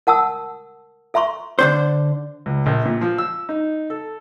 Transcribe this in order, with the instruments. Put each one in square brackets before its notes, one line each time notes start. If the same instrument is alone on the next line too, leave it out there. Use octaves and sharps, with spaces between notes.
[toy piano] A#4 F#5 A5 D#6 E6
A4 E5 A#5 C6 C#6
[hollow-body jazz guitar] D3 D4 C5
[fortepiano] C#2
A#1
A#2
F3
E6
D#4
A4